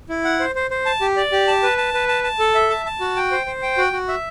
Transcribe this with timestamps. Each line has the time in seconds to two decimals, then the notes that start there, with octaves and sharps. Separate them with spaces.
0.09 E4
0.24 F#5
0.40 C5
0.55 C5
0.71 C5
0.86 A5
1.01 G4
1.17 D5
1.32 G4
1.48 A5
1.63 B4
1.78 A5
1.94 B4
2.08 A5
2.24 A5
2.39 A4
2.55 E5
2.70 A5
2.86 A5
3.01 F#4
3.16 G5
3.32 C5
3.46 C5
3.62 G5
3.78 F#4
3.93 F#4
4.08 E5